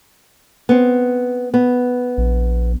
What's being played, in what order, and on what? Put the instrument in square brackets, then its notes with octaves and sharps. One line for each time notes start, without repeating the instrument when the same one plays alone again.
[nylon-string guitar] B3 C4
B3
[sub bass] A#1